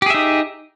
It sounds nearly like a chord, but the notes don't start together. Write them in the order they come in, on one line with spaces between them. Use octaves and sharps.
G4 G#4 E5 D#4